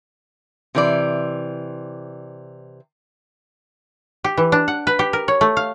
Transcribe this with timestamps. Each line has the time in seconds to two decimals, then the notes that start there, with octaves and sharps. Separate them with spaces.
0.75 C3 E3 D5
4.24 G4
4.37 E3
4.52 D4
4.68 F#5
4.87 B4
4.99 G4
5.13 A#4
5.28 C#5
5.41 A3
5.57 F5